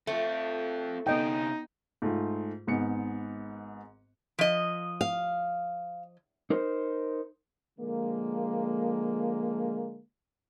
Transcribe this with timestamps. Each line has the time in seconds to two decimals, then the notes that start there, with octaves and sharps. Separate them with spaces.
0.07 A3 C4 F4
1.07 C3 B3 C#4 D#4 D#5 G5
2.02 G#2 A3 F4
2.67 G#1 G#2 B3 C#7
4.39 F3 D#5
5.01 F5
6.50 D#4 A#4 C5
7.79 D3 F3 G#3 A#3